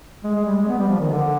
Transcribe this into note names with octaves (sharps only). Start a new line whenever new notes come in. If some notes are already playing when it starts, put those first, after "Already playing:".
G#3
G#3
G3
G#3
B3
G3
F3
D#3
D3